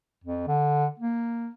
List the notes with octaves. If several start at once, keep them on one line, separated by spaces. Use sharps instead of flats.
F2
D3
A#3